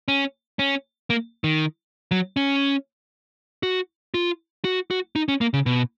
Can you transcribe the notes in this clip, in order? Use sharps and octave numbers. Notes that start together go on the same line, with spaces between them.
C#4
C#4
A#3
D#3
F#3
C#4
F#4
F4
F#4
F#4
D#4
C#4
A#3
C#3
B2